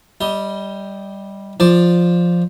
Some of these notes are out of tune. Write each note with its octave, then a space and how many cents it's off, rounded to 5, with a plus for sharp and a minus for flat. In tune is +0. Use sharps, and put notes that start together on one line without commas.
G3 +0 D#5 +25
F3 +0 D5 +5